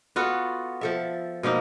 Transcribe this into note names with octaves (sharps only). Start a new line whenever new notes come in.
B3 F4 F#4 A4
F3 A4 E5
B2 F3 A#3 D#4